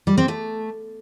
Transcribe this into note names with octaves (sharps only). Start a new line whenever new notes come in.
G3
C4
A3